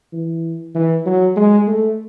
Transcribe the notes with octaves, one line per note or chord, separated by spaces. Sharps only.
E3
E3
F#3
G#3
A3